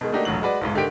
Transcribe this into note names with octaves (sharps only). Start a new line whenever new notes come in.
B2 D#3 G#3
A3 A#3 D4 D#4 F#4 G4
E1 A#1 A2 F#3 F#7
G#3 F#4 B4 D5
F#1 B1 G#2
D3 D#3 D4 G4 D7